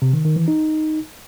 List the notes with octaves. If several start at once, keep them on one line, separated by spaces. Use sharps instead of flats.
C3
D#3
D#3
E3
D#4